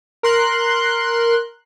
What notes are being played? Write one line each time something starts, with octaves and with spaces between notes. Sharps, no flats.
A#4 C6 F#6